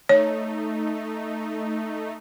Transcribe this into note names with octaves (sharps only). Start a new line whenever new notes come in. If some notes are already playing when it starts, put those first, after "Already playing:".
A3 D#4 C#5